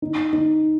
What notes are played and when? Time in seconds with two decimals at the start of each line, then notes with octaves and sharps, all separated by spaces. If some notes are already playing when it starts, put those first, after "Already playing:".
0.02 D#4
0.33 D#4